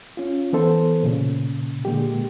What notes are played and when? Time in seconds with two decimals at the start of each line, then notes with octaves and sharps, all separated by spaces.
0.17 C#4 F4
0.53 E3 B3 A4 C5
1.03 A#2 C#3
1.85 A#2 D3 G#3 A#3 G4